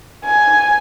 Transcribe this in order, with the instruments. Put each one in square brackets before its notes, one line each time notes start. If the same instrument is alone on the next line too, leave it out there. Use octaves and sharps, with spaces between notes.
[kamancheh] G#5